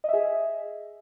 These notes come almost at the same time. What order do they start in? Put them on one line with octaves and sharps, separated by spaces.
D#5 E5 G#4